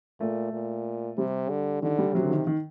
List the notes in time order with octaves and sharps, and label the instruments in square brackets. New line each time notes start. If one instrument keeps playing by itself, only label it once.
[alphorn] A#2 [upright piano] A3
[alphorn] A#2
[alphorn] C3 [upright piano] G3
[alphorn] D3
[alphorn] D3 [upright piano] D#3
[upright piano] G3
[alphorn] C3 [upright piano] F#3
[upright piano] D3
D#3
D#3